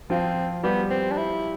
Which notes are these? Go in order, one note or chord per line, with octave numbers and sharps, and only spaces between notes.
F3 C4 F4
G3 B3 G4
C4
D4
E4